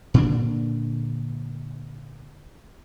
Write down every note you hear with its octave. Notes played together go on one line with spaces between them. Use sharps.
A#2 D3 D4